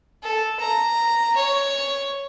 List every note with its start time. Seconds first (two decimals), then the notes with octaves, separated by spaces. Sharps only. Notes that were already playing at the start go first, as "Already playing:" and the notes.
0.23 A4
0.60 A#5
1.36 C#5